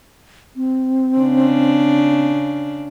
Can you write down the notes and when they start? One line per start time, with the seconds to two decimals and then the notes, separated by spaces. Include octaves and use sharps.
0.56 C4
1.19 C#3 D4